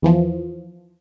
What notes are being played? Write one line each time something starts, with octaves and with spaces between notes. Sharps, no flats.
E2 E3 F3